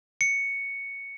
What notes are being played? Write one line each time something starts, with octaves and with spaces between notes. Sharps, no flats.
C#7